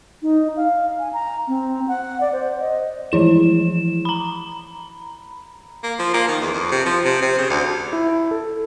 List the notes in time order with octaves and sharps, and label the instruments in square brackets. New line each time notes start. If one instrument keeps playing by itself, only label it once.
[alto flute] D#4
F5
G#5
A#5
C4
F#5
D5
C5
D#5
[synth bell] E3 F3 E4 E7
A#5 B5
[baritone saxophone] A#3
F3
A#3
D#3
E2
F2
C3
F3
C3
C3
C#3
D2
[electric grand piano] E4
A4